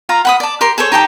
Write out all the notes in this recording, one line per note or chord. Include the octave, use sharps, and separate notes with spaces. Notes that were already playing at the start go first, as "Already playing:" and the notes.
F4 F5 A#5
F#5 B5 D#6
D5 A5
G4 A#4 C6
G#4 A4 C5 C#5
D#4 G4 G5 A5